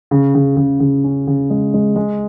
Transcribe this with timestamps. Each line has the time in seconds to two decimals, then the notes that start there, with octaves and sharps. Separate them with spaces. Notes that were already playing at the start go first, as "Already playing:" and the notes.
0.11 C#3
0.34 C#3
0.57 C#3
0.80 C#3
1.04 C#4
1.27 C#3
1.50 G#3
1.74 G#3
1.96 G#3